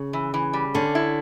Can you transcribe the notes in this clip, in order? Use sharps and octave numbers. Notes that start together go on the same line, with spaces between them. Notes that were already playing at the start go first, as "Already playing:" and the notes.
Already playing: C#3
E3
E3
G3
D3 C#4
E4